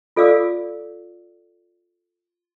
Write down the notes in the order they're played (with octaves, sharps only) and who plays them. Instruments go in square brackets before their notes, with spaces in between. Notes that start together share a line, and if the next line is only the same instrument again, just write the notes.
[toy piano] F4 A4 D5 F5 D6 E6